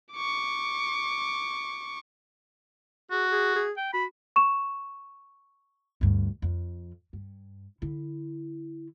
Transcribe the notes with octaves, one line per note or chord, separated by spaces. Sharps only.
C#6 D6
F#4 G#4
G#4
G#4
G5
F#4 B5
C#6 E7
D2 G2
F2
G2
D3 E4